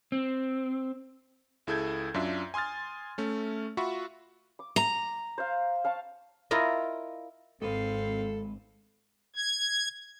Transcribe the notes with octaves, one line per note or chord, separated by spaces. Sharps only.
C4
C#2 E4 G#4 A4 G6 G#6
F#2 D4 F4 E5
G#5 C6 D#6 F6 A6
A3 C#4
F4 F#4 E5 B5 C#6
D6
A#5
C5 F5
F5 A5 C#6
E4 F4 A#4 D#5
G#1 G#2 C4 A4 B4 F5
G#6